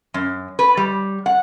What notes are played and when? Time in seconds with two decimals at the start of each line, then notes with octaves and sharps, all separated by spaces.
0.14 F#2
0.59 B4
0.77 G3
1.26 F#5